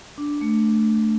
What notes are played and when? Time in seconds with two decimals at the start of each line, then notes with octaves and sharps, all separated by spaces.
0.18 D4
0.41 A3